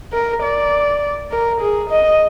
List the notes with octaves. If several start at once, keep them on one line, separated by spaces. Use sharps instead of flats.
A#4
D5
A#4
G#4
D#5